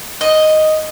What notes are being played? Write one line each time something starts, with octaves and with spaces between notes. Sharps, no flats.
D#5